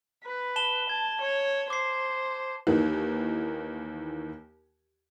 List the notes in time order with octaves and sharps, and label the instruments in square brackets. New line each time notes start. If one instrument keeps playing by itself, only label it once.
[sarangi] B4
[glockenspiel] A5 E7 G7
[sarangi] A5 [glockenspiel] G#6
[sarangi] C#5
[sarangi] C5 [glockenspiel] D6 C7
[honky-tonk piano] D#2 D#3 E3